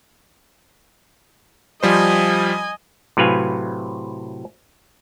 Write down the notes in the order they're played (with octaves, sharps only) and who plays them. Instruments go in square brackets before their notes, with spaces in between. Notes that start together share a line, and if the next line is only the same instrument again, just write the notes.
[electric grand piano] F3 G3 C5 [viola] D#5 G#5
[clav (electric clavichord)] A2 C3 F#3 B4 F5 G#5